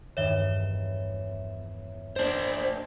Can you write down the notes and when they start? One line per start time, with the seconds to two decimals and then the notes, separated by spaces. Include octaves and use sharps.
0.17 E2 G2 D#3 C#5 E5
2.16 D4 C5 D#5 D7